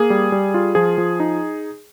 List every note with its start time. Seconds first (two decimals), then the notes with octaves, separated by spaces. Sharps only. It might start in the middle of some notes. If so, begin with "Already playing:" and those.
Already playing: A#3 G#4
0.10 G3
0.32 G3
0.54 F4
0.75 F3 G#4
0.98 F3
1.20 D#4